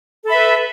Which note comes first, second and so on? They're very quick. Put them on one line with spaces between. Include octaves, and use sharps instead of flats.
A4 B5 E5 B4